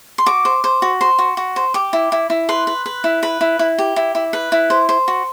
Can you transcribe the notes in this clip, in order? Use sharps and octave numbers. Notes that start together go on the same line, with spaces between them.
C6
F#4 D6
C5
C5
F#4
C5 C6
F#4
F#4
C5
G4 D6
E4
E4
E4
B4 C6
B4
B4
E4
B4 B5
E4
E4
G4
E4
E4
B4
E4
C5
C5
F#4